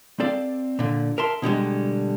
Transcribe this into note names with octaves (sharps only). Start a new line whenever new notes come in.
C4 A4 D5 F5
A#2 D3
A#4 E5 A5 C6
B2 D3 G3 G#3